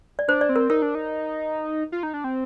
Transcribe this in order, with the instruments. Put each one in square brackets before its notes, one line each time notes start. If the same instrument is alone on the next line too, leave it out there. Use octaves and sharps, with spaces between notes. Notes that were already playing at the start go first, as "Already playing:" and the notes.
[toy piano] D5
[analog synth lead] D4 [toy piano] C5
[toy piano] D5
[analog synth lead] C4
[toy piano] A#4
[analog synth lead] D#4 [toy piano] A#4
[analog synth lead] D4
D#4
F4
D#4
D4
C4